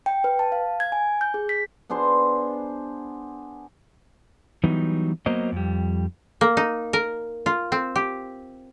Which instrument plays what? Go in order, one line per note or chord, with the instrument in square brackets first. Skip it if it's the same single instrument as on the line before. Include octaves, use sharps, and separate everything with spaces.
[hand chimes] G5
B4
A5
F5
G#6
G#5
G6
G#4
B6
[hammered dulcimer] B3 D4 G#4 C5
[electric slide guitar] E3 F#3 G3 B3 D#4
F#3 A#3 B3 A#4 C5 D#5
F2 G3
[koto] A#3
D#4
A#4
F4
C4
G4